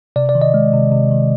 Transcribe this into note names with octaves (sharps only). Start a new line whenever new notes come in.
C3 D5
D5
D#3
D#5
G#3
C3
C3
D#3